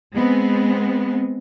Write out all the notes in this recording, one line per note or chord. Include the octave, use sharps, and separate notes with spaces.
G#3 B3 C4